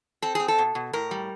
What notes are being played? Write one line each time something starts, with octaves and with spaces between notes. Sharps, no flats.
C4 A4
C4 G#4
A4
B2
B2
A2 A#4
G3